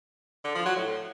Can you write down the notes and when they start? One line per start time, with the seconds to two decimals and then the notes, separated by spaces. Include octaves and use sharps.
0.44 D3
0.55 F3
0.65 F#3
0.76 A2